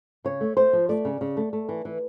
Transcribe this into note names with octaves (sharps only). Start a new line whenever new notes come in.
C#3 C#5
A3
A3 C5
F3
A3 D5
C#3
C#3
A3
A3
E3
E3